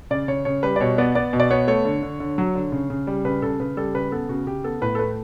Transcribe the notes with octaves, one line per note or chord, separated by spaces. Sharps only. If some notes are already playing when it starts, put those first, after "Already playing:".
C#3 D5
C#3 C#5
C#3 C#5
G3 B4
D5
B2 C#5
B3 D5
B3 D5
B2
D5
B3 C#5
A3 C#5
D3
D3
D3
F#3
D3
C#3
C#3
G3
C#3 B4
C#3 A4
C#3 B4
G3 A4
C#3 B4
B3 A4
C#3 F#4
C#3 G4
B3 A4
A2 B4
A4
A3 B4